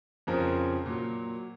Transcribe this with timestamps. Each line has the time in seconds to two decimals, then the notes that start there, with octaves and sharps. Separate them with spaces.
0.27 F2 C#3 F3 A#4
0.86 A#2 F#3